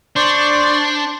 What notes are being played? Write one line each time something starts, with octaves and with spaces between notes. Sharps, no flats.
D4 C5 D5 C6 C#6